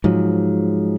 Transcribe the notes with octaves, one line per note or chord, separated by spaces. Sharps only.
G#2 F3 F#3